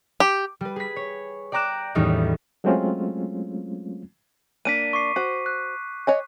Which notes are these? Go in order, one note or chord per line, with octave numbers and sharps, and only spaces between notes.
G4
G3 B4
G#4 B6
C#5
D5 G5 A#5 D6 F#6 E7
E2 A2 D#3 G3 C#4 D#4
F#3 G#3 A3 C4 C#4 F4
A#3 D4 B6 D7 D#7
C#6 D6 C7
F#4 C5
F#6
C#5 D#5 G#5